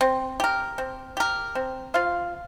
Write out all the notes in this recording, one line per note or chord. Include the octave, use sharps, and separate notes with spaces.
C4
G4 A#4
C4
G4 A#4
C4
F4 C5 F5